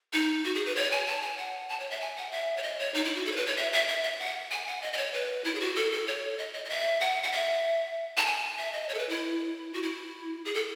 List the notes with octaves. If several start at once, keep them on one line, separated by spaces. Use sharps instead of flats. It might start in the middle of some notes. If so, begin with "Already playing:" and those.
D#4
F#4
G#4
B4
C#5
G#5
A5
G#5
F#5
A5
C#5
E5
G#5
F#5
E5
C#5
D#5
C#5
D#4
E4
F#4
A4
C#5
B4
C#5
E5
E5
E5
E5
F#5
G#5
F#5
D#5
D#5
C#5
B4
E4
G#4
F#4
A4
A4
C#5
D#5
D#5
D#5
E5
F#5
F#5
E5
A5
G#5
E5
D#5
C#5
A4
B4
E4
F#4
E4
G#4
A4